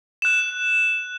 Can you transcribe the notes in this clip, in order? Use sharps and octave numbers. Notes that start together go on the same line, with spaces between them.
F#6 E7